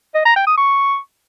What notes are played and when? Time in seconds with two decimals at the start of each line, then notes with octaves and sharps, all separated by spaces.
0.15 D#5
0.25 A#5
0.36 G5
0.47 D#6
0.57 C#6